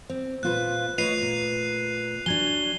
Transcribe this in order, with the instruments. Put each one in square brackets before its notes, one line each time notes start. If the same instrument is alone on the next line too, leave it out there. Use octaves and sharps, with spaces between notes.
[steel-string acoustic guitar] C4 [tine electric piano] C5
[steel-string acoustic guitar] A#2 F4 B4 [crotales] F#6
[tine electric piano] A3 F4 B4 [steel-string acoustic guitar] C#5 D#5 [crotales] C7 D#7 F7
[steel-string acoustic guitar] A#2
[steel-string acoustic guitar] F#3 D4 [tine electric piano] G#5 G#6 [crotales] G7